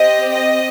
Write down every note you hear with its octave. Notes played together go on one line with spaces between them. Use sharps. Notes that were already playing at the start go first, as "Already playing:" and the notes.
Already playing: C4 G4 D#5
D#5